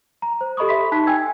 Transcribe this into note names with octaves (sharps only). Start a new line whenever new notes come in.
A#5
C5
G4 A4 D#5 B5 C#6 D#6
E5 B5 C6 B6
D#4 A5 F#6 B6
G5 G#5 E6 G#6